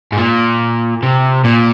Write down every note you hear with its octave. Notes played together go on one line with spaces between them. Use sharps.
G#2
A#2
C3
A#2